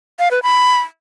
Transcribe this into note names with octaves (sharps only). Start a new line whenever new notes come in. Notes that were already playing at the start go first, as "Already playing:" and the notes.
F5
B4
B5